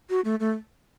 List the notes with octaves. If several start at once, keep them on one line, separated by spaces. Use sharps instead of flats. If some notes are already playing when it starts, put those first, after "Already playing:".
F#4
A3
A3